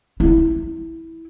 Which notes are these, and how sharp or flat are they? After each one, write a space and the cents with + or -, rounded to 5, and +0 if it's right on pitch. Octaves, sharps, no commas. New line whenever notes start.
E4 -10